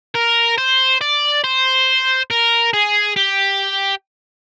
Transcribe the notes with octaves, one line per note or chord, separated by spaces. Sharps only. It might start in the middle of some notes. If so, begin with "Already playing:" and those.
A#4
C5
D5
C5
A#4
G#4
G4